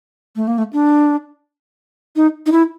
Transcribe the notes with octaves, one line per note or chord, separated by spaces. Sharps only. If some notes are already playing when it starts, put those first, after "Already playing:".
A3
A#3
A3
D4
D#4
D#4
E4